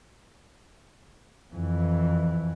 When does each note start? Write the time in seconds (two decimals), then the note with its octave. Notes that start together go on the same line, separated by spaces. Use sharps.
1.54 F2 E3